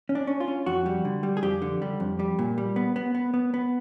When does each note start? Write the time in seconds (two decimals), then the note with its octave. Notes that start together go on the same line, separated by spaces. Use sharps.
0.09 C#4
0.15 D4
0.27 C#4
0.40 F4
0.48 C#4
0.66 F2 F#4
0.86 G3
1.05 D3
1.23 G3
1.37 G#4
1.43 F2 G4
1.62 D3
1.82 G3
2.00 F2
2.20 G3
2.39 A#2
2.58 G3
2.76 B3
2.96 B3
3.15 B3
3.34 B3
3.54 B3